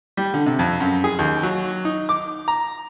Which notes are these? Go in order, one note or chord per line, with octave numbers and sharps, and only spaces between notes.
G3
D3
C3
F2
F#2
G#4
D#2
F#3
D#4
D6
A#5